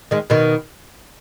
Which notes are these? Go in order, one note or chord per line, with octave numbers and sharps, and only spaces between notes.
D#3 G#3
B2 D#3